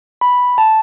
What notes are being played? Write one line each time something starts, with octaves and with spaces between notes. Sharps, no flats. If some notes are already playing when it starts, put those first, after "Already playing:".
B5
A5